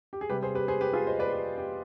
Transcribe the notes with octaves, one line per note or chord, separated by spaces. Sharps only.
G4
G#4
C3 G3 G4 B4
G#4 C5
G4 B4
G#4 C5
G4 B4
F4 G#4
C5 D#5
B4 D5
G4 B4
G4